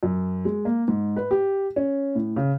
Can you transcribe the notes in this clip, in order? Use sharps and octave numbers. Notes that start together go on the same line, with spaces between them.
F#2
G#3
A#3
G#2
B4
G4
C#4
A2
C#3